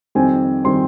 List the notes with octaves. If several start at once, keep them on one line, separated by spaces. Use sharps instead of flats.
F2 D#3 G3 C4 G#5
D#3 G3 C4 C6